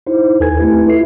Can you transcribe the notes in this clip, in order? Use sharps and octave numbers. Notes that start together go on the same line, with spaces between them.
D#4 E4 C5
D#2 A4 B4 G#5 G#6
A3 C4 E4 G4 B4
E4 F4 A4 E5 C7